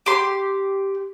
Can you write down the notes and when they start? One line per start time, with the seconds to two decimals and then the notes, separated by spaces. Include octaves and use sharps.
0.06 G4 C6